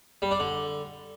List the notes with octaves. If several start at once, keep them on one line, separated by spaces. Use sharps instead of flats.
G3
D4
D3